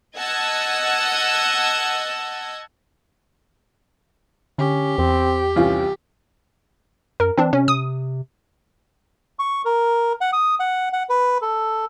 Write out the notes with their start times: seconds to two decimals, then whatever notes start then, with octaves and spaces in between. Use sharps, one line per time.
0.18 D#5 F#5 A5 E6 G#6
4.58 D3 C#4 G4
4.98 E2 C4
5.56 C2 E3 C#4 F4
7.20 F#2 A#4
7.37 E3 C4 D4
7.53 C3 C#4
7.68 C3 D#6
9.39 C#6
9.65 A#4
10.21 F#5
10.33 D#6
10.60 F#5
10.93 F#5
11.09 B4
11.42 A4